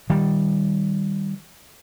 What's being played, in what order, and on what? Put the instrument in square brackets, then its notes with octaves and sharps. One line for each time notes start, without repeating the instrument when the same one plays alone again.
[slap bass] D#3 G3